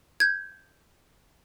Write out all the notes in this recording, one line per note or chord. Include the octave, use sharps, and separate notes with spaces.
G6 G#6